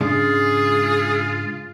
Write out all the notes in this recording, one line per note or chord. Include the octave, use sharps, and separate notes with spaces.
G#2 C#3 G#3 D4 F4 G#4